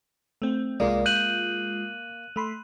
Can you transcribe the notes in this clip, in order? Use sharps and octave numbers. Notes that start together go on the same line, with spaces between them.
A3 C4
C2 G#3 A#3 F4 A#4 D5
F#6 G6 D#7 F#7
A3 B5 C6